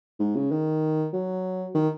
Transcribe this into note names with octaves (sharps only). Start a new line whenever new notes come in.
G#2
C#3
D#3
F#3
D#3